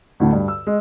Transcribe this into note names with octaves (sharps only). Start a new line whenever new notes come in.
D2 A2 D3
G2
E6
G#3